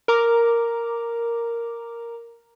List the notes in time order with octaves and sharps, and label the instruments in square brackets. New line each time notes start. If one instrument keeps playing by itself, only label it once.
[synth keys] A#4 A#5 D6